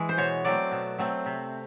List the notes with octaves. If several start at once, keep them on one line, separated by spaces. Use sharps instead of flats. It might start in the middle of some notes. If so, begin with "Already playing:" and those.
Already playing: E3 G#3
C5
B2 C#5
F#3 A3 C4 D5
B2
F#3 A3 C4
C3